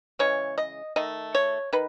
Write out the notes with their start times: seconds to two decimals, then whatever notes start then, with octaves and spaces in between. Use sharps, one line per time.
0.19 C#3 E3 G#3 C#5
0.58 D#5
0.96 D#3 A3 D#5
1.35 C#5
1.73 D#3 B4